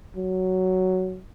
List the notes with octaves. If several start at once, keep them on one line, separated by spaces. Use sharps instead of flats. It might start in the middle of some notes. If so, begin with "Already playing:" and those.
F#3